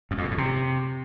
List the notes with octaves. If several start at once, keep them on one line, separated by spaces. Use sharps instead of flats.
F#2
F2
B2
A2
C3